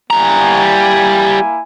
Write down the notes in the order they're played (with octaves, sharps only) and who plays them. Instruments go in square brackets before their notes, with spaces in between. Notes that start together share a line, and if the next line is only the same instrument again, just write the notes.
[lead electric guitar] G3 A#5 [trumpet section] A#3 E4 G#5